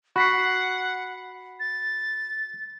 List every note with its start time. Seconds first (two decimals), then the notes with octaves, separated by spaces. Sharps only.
0.16 F#4 F#5 B5 B6 C7
1.60 A6